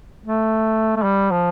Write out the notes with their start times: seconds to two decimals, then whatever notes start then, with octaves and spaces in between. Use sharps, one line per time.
0.26 A3
0.97 A3
1.03 G3
1.31 F3